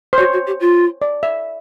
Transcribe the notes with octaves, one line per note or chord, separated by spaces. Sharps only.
C5
F#4 C#5
F#4
G4
F4
D5
E5